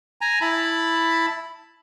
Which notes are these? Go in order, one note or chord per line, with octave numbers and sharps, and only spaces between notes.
G#5 A#5
E4 A5 B5